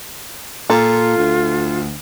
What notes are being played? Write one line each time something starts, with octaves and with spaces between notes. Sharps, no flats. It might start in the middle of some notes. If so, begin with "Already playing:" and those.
A#2 F4 A4
D2